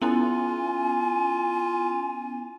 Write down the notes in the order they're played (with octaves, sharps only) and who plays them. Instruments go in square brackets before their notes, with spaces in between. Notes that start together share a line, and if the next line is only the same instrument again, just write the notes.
[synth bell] B3 C#4 E4 [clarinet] F4 [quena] G#5